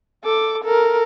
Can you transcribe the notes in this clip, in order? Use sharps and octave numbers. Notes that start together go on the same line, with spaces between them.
A4 D6
A4 A#4